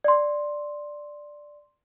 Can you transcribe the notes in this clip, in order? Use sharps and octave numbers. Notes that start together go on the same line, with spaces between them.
D5 C6